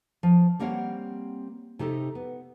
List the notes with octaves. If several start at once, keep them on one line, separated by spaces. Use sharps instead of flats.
F3
G3 A#3 C4 C#5 F#5
C3 D#4 G4 A4
B3